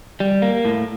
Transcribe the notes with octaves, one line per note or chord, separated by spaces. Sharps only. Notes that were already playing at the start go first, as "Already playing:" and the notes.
G3
A#3
A2